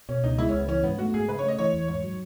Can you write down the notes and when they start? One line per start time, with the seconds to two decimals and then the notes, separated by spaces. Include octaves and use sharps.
0.09 B2 C#4
0.23 C#2 D#4
0.38 G#3 E4
0.49 C#4
0.53 C#2
0.59 B3
0.68 E3 C#4
0.83 G#2 B3
0.98 A3 F#4
1.14 G#2 G#4
1.29 C#3 B4
1.39 C#5
1.43 A3
1.48 D#5
1.59 E3 C#5
1.74 E2
1.88 G#2 C#5
2.04 F#3